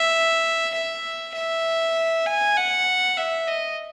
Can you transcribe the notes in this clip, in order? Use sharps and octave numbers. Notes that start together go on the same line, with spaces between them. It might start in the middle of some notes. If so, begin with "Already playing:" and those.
Already playing: E5
E5
E5
G#5
F#5
E5
D#5